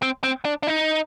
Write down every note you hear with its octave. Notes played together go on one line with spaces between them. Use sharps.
C4
C4
D4
D4
D#4